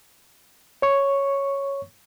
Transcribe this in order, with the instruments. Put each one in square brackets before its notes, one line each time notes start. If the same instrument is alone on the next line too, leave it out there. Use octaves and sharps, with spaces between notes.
[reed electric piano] C#5 C#6